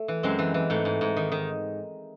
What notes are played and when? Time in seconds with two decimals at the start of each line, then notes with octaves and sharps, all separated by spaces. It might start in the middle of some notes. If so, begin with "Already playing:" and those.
Already playing: A3
0.08 E3
0.23 F#2 G#3 C4
0.39 E3
0.54 E3
0.70 G#2 A3
0.85 G#2
1.01 G#2
1.17 D#3
1.32 D#3